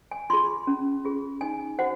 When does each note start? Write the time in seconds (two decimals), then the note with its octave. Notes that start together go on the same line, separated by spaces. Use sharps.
0.11 G#5
0.30 F4 G#4 C6
0.67 C#4
1.05 F4 G#4
1.41 D#4 G#5
1.79 F#4 C5 F#5